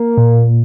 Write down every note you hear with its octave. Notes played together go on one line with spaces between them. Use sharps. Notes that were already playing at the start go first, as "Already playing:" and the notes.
Already playing: A#3
A#2